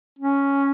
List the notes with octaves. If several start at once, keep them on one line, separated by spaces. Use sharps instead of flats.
C#4